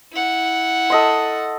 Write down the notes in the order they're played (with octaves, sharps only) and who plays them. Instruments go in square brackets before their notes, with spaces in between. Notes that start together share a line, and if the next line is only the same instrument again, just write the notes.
[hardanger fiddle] E4 F#5
[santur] A4 D#5 C6